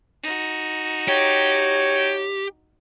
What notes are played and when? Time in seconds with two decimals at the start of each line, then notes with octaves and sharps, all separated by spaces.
0.23 D#4 F#4
1.08 G4 C#5